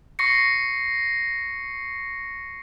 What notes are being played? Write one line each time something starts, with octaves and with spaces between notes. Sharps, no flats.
C#6 A#6 C7 C#7